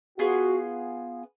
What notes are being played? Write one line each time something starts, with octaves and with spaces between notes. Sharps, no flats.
B3 F4 F#4 G#4